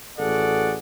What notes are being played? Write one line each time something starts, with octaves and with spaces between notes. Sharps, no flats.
A1 F#4 G#4 A4 D5 F#5